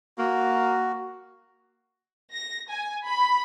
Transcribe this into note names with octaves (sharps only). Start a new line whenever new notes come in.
A#3 F#4
A#6
G#5
B5